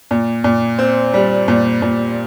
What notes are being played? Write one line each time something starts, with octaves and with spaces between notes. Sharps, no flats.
A#2
A#2
C4
G3
A#2
A#2